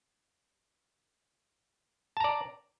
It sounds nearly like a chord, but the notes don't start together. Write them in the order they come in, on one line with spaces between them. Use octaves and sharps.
A5 A#5 D5